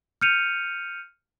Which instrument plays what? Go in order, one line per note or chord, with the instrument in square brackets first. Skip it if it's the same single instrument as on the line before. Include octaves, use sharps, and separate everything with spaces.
[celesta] F6 G6 C#7 D#7 F7